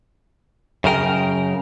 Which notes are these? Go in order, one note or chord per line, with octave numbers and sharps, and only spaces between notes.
F#2 C#3 A#4 G5